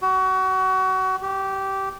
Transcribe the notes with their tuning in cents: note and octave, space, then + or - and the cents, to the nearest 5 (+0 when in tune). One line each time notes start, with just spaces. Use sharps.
F#4 +30
G4 -15